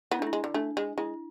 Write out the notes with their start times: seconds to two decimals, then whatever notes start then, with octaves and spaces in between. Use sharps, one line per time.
0.11 B3 E4
0.19 D4
0.22 A3
0.27 E4
0.33 G#3
0.44 D3
0.54 A3 D4
0.77 G#3
0.98 G#3 E4